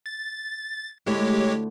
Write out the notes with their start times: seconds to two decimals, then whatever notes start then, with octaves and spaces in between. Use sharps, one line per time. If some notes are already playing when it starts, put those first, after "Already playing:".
0.06 A6
1.06 D2 G#3 A3 E4 G4 C#5